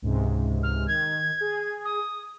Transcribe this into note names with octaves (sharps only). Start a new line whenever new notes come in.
C#2 G#2 C3
F6
D#3 G#6
G#4
D#6